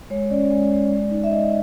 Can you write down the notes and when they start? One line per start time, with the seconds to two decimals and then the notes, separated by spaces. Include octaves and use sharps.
0.10 G#3 C#5
0.30 C#4 D5
0.51 G#3
0.71 G#3
0.91 G#3
1.11 D#4
1.24 E5
1.31 G#3 D#5